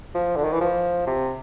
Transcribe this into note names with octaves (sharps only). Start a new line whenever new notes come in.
F3
D3
D#3
E3
F3
C3